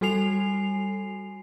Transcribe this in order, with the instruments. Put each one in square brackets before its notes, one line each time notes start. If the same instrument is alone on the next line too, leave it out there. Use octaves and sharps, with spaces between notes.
[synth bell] G3 F#4 A4 G#5 C7 F7